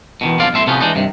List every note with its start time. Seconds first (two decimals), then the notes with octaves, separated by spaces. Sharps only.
0.21 B2 D#3 E3
0.39 B1 F2 D3 F4 D5 F5
0.53 B1 A2 E5 C6
0.67 A2 C3 F3 B3 C#4 D#4
0.80 E3 G#3 D4 D#4
0.95 G2 C3 D#3